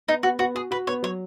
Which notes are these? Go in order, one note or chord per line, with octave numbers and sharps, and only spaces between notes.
B3 D#4
B3 F#4
B3 F#4
F#4 G#4
F#4 B4
B3 C#5
F#3 C#5